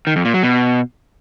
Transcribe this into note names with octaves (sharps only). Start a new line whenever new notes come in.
D#3
F2
A#2
F#3
B2